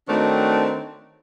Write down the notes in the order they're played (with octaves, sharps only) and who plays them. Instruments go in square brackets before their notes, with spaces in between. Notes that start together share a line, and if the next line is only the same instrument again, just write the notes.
[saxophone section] D#3 A3 C4 D4 F#4 C#5